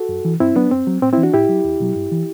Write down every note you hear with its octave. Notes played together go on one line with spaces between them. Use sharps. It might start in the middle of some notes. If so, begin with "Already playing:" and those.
Already playing: F#4 A4
F#2
E3
G2 C4 E4
F#3 B3 D4
F#2 C4
F#3
A2 C4
C4 E4
E3
D4 F#4
A2 E4 G4
F#3
E2
B2 F#3
G2
E3